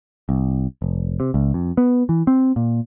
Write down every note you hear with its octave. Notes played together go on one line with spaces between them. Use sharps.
C2
F1
C3
C#2
F2
B3
E3
C4
A#2